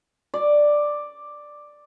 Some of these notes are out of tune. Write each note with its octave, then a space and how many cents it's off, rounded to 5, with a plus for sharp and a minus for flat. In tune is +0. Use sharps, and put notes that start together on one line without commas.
D5 +5